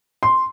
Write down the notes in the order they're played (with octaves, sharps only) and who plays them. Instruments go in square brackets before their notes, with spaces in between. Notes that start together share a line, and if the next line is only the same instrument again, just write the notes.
[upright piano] C6